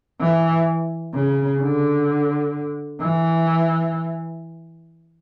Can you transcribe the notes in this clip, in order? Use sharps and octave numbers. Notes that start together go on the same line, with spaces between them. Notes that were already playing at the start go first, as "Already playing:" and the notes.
E3
C#3
D3
E3